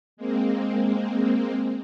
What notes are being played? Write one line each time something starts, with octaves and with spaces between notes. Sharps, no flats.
G#3 A#3 C4